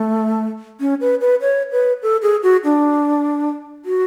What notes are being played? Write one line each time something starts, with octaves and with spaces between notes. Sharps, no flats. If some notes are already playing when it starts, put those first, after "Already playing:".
Already playing: A3
C#4
B4
B4
C#5
B4
A4
G#4
F#4
D4
F#4